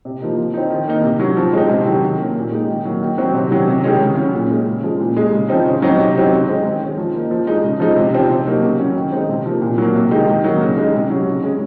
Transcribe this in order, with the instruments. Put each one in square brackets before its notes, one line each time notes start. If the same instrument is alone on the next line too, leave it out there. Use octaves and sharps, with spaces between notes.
[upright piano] C3
F3 A#3 D#4
F3
C4 D#4
D#3
A#3 D#4
C3
F#3 C#4
F3
G#3 C4 D#4
C3
D#3 F#3
D#3
A#3 C#4
A#2
G#3 D#4
D#3
F#3 A#3
D#3
F#3 C4
C3
D#3 F#3 C#4
C3
D#3 G#3 C#4
C#3
F#3 C#4
A#2
G#3 C#4
C#3
F3 G#3
A#2
G#3 D#4
C#3
F3 C4 D#4
C#3
F#3 C4 D#4
C3
F#3 C4 D#4
C#3
G#3 C4 D#4
D#3
G#3 C#4
F3
A#3 D#4
F3
G#3 D#4
C#3
F3 G#3 D#4
C3
F3 C4
C3
F#3 A#3 D#4
C#3
F#3 C#4
D#3
G#3 C4 D#4
C3
F3 A#3
A#2
F#3 A#3
C3
D#3 G#3 D#4
D#3
F#3 A#3 D#4
C#3
G#3 D#4
C3
F#3 C#4
C#3
G#3 C#4